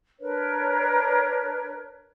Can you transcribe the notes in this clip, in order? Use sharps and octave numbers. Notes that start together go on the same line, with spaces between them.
D4 A#4 B4 C#5